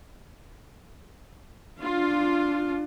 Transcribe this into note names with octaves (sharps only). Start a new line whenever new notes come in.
D4 F4